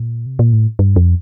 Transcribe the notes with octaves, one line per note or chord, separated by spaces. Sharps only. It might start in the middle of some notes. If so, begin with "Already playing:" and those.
Already playing: A#2
C3
A#2
A2
G2
F2